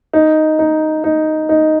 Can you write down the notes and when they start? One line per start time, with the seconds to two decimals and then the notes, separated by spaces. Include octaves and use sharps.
0.13 D#4
0.59 D#4
1.04 D#4
1.49 D#4